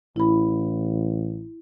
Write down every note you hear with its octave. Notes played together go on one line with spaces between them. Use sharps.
A1 E4 B5